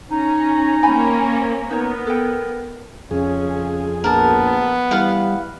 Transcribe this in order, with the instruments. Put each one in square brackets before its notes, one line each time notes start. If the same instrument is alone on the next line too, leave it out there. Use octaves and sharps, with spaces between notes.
[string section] C#4 [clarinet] D#4 [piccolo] A#5
[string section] A#3 C4 C#4 [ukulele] G5 G#5 B5
[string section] B3 [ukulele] D#4 C#5 [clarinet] A#4
[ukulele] A4 G5
[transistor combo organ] F2 G#4 [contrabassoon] C#3 [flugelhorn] C#4
[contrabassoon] A#1 [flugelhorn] B3 [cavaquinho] A#4 A5
[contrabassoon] E3 [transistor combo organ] G3 [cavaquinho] B4 F5 F#5